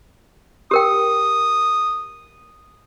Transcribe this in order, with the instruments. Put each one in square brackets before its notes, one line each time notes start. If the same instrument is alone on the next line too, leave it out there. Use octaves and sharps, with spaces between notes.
[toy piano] G4 A#4 G5 [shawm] D#6